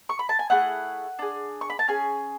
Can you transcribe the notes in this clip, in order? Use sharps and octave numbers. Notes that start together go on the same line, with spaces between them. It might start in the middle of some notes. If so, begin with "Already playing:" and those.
C#6
B5
A5
G#5
A3 E4 G#4 F#5
D4 G#4
C#6
B5
A5
C#4 G#4 G#5